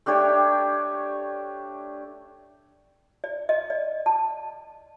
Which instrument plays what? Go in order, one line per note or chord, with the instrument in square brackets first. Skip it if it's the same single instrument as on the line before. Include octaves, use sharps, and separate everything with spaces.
[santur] A3 D4 G4 C#5
[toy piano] D5
D#5
D5
A5